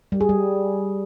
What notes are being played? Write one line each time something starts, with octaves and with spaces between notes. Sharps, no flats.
G3
G#4
G3